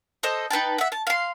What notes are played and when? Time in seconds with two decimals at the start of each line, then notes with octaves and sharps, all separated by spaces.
0.23 A4 C5 D#5 D#6
0.50 D#4 B4 G5 A5
0.78 E5 F#5
0.92 A5
1.07 F5 C6